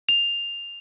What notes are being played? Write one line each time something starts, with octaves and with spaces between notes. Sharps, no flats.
F7